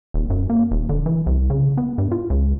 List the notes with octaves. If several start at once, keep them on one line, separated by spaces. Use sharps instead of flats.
D#1
F#2
A#3
D#1
D3
E3
C2
C#3
B3
G2
F4
C#2